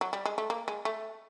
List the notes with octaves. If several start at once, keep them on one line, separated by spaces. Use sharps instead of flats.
F#3
G3
G#3
A3
A#3
G#3
A3